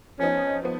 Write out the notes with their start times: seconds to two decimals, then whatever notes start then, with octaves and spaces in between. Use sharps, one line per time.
0.19 F2 F3 B3 C#4 D#4
0.63 F3 B3